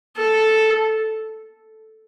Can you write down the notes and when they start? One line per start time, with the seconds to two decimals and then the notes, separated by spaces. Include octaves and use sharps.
0.17 A4